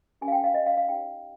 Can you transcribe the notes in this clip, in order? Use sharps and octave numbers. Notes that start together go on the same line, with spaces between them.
C#4 G4 A#4 G#5
F5
G5
F5
D#5
F5
F5
D#4 G4 C#5 G5